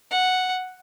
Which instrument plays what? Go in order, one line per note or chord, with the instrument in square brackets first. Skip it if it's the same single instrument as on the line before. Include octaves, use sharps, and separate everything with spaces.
[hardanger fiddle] F#5